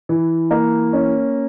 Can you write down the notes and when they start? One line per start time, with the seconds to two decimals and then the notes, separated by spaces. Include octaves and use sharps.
0.09 E3
0.51 A#3
0.93 C#4